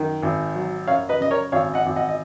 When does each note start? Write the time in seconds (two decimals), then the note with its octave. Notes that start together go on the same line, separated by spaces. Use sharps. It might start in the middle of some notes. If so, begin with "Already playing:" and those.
Already playing: F#2 D#3
0.23 G#1
0.55 F#3
0.88 F#2 C#5 F5
1.09 B4 D#5
1.20 C#3 D#5
1.31 A#4 C#5
1.52 G#1 C#5 F5
1.74 D#5 F#5
1.86 G#1
1.96 D#5 F#5
2.09 D#5